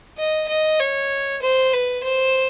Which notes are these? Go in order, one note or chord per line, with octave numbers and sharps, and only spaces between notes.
D#5
D#5
C#5
C5
B4
C5